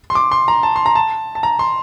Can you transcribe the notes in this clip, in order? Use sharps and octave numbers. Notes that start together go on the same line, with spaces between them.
C6
D6
C6
A#5
A5
C6
A#5
A5
A5
A#5
C6